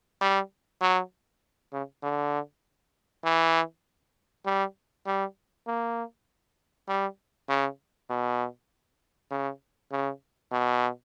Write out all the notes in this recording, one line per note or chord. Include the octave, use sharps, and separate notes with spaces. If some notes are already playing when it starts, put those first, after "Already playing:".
G3
F#3
C#3
D3
E3
G3
G3
A#3
G3
C#3
B2
C#3
C#3
B2